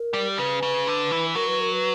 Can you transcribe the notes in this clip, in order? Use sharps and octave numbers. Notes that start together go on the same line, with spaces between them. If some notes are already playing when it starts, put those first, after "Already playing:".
Already playing: A#4
G3
C#3 B4
C#3
D3
E3
F#3 A#4
B4
A#4
B4